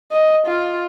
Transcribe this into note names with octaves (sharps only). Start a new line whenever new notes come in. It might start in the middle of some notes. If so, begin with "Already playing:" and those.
D#5
F4